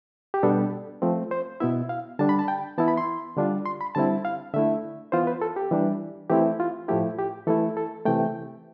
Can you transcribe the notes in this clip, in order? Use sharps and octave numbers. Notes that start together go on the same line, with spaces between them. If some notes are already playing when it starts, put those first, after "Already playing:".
G4
B2 G3 B3 D4 A4
F3 A3 C4
C5
B2 B3 E4 E5
F5
D3 G3 D4 A5
B5
A5
G5
E3 B3 E4 A5
B5
C6
D3 G3 D4 F4
C6
B5
D3 G3 C4 E4 A5
F5
D3 A3 E4 E5
E3 B3 F4 C5
B4
A4
G4
E3 G3 D4
E3 A3 C4 E4 G4
F4
A2 F3 A3 E4 G4
G4
E3 A3 E4 A4
A4
C3 E3 A3 G5